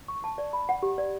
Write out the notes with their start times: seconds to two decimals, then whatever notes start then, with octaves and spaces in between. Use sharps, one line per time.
0.08 C#6
0.24 A5
0.38 D5
0.53 B5
0.69 F#5
0.83 G4
0.98 D5